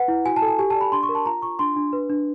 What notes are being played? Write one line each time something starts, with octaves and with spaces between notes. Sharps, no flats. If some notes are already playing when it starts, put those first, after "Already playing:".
Already playing: B4 F#5
E4
F#4 G#5
A5
A4
G#5
G4 G#5
D5 A5
B5
D4 C6
C#6
A#4
A5
F4 A#5
F4 C#6
D4 C6
D4
B4
D4